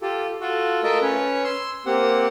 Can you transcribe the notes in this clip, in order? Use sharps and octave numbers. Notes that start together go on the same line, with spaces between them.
F4 G4 A4
F4 F#4 A4
A3 F4 A#4 D#5 E5 A5
C#4 B4 C#5
C6 E6
A#3 C4 G4 F#5